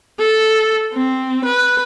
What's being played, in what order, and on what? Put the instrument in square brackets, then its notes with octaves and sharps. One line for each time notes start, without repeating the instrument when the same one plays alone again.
[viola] A4
C4
B4